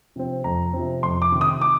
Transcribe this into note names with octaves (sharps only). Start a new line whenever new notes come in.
C3 F3 C4
F2 A#5
C3 F3 C4
F2 C6
D6
C3 D#3
D#6
D6